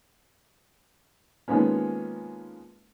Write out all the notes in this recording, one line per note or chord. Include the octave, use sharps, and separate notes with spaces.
D#3 F3 G#3 A#3 B3 C#4